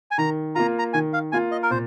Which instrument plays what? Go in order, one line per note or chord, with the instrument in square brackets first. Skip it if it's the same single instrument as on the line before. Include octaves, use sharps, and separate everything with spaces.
[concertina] G#5
[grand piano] D#3 [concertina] A#5
[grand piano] A#3 F4 [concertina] A#5
[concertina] A#5
[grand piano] D#3 [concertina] G#5
[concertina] F5
[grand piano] A#3 F4 [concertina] G#5
[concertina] D#5
A#4
[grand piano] A#2 [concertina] C5